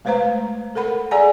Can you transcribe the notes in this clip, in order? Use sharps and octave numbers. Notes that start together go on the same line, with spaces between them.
G#3 A3 B4 C5 F5 A#5
A4 A#4 F#5 B5
G#4 D5 F#5 G#5 A#5